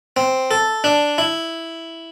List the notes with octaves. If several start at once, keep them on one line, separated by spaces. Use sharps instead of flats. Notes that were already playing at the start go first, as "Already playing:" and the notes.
C4
A4
D4
E4